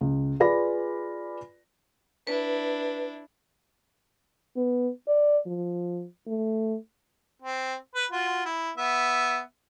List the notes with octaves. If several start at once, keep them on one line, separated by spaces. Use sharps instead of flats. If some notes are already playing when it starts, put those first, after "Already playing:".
C#2
F4 G#4 B4 D5 B5 A#6
D4 E4 B4
B3
D5
F3
A3
C4
B4
F4 F#4
E4
B3 E5